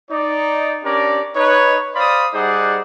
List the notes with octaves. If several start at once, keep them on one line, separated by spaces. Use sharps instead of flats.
D#4 D5
C#4 D4 G4 A#4 D5
D#4 B4 C#5
C5 D5 F5 B5 C6 D#6
G3 D#4 G#4 C5 D5 F#5